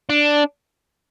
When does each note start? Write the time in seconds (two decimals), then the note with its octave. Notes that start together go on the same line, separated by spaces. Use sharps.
0.09 D4